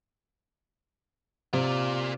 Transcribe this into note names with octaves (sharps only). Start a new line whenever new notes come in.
C3 F4 D5